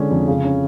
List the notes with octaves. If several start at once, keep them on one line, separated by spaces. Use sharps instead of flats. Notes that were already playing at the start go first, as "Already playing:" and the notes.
Already playing: D3 G#3 C#4
F2
C#3
C#4